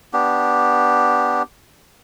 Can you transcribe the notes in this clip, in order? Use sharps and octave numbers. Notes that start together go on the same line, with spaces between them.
B3 D4 G4